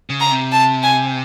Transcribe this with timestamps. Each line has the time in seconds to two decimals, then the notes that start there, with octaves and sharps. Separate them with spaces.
0.10 C#3
0.20 A#5
0.31 C3
0.52 A5
0.83 G#5